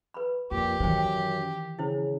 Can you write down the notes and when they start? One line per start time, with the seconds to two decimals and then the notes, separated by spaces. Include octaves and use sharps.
0.14 B4 B5
0.51 F2 A#2 G4
0.80 F#2 D#3 E3 C5 G5
1.79 C#3 E4 C5